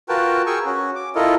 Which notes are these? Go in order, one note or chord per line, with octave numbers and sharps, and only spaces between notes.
F4 F#4 A#4 B4 G5 A5
G#4 A#4 G5 G#5 C#6 E6
C#4 F#4
D6
E4 F4 A4 A#4 D#5